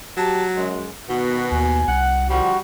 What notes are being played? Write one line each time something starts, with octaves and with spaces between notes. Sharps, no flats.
F#3 G4 A5
F#2 G#3
B2 D#3 B3 F#4
D#2 G#5
C2 F#5
D3 F3 G3 F#4